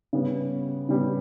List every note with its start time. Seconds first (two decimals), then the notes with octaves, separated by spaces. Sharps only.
0.13 C#3 G3 B3
0.89 C#3 G3 B3